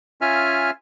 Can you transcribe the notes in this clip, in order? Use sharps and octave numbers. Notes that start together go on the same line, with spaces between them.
C#4 F4 E5 G#5 F6